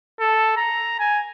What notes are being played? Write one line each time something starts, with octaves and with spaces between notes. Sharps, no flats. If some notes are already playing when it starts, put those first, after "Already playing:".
A4
A#5
G#5